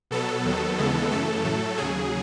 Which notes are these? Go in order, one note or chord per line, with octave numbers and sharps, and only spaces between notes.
B2 F#3 B3 A4
D#2 D#3 F#3 B3
D#2 C#3 E3 G#3 B3
F#2 C#3 E3 A3 A4
A2 F#3 A3
D#2 C#3 F#3 G#4